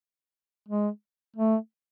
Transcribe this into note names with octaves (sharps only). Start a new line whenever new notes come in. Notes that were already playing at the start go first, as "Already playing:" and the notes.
G#3
A3